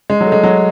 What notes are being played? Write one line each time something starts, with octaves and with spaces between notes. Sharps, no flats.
G#3
F#3
A3
G#3
F#3